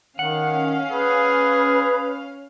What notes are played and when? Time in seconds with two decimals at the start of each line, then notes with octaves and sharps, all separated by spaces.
0.19 D#3 C#4 F5 F#5
0.91 G#4 B4